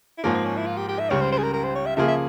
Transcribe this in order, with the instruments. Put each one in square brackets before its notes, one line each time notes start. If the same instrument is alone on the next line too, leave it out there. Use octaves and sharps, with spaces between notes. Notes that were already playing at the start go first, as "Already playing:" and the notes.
[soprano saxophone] E4
[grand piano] G#2 F3 A#3 [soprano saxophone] C#4
[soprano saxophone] C4
C#4
E4
F4
G4
G4
E5
[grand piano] C#2 C#3 G3 [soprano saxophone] C#5
[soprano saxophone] C5
C5
G#4
A#4
A#4
C5
C#5
E5
[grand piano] C#3 F3 A#3 F4 G#4 [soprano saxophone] E5
[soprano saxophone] E5